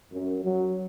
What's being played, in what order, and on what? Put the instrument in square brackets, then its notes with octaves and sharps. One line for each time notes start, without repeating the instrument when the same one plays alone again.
[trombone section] F#2
F#3